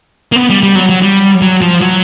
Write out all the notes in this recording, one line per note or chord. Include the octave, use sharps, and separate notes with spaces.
A#3
B3
G3
G3
F#3
F#3
G3
F#3
F3
F#3